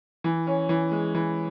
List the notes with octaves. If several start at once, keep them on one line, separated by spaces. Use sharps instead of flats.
E3
C#4
E3
G#3
E3